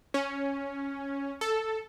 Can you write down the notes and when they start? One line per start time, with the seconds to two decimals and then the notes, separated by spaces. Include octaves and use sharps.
0.14 C#4
1.41 A4